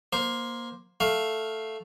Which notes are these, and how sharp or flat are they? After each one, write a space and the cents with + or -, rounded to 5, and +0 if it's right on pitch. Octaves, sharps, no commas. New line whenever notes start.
A#3 +15 C5 +0
A3 +0 F5 +10